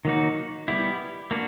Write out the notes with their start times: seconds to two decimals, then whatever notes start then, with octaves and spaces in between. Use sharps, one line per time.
0.05 D#3 F#3 A#3 D#4 F#4
0.68 G3 B3 E4 G4
1.31 A#3 D4 F#4